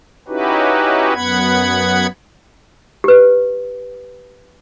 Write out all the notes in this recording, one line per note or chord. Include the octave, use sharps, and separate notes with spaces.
C#4 D#4 E4 F#4 G4 B4
F#2 B3 F#5 B5 G#6
G4 B4